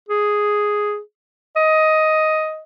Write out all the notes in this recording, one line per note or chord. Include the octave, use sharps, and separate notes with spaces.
G#4
D#5